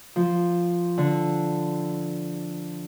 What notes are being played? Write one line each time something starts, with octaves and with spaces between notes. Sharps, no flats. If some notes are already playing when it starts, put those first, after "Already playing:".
F3
D3